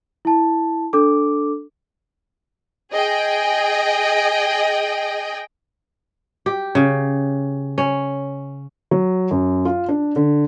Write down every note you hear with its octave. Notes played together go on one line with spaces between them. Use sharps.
E4 A5
D4 A4 D6
G#4 D#5 G5
G4
C#3
C#4
F#3
F#2
F4
D4
D3